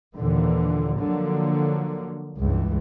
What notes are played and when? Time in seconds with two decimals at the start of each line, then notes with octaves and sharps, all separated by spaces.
0.16 D#2 A#2 D3 E3
1.00 D3 F3 F#3 A#3
2.38 C#2 G2 E3